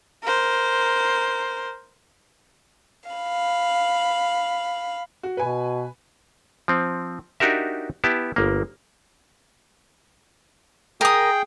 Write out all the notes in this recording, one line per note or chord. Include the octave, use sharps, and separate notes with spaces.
A#4 C5
F5 B5
F#4
B2 B4 G#5
F3 C4
D4 D#4 F#4 G4 A#4 E5
B3 E4 G4 A5
G1 A#3
G#4 A#4 G5 D#6